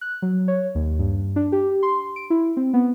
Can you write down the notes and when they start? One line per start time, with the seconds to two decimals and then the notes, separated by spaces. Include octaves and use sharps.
0.01 F#6
0.22 F#3
0.48 C#5
0.75 D#2
0.99 G2
1.36 D4
1.52 G4
1.83 C6
2.16 D7
2.30 E4
2.57 C4
2.74 B3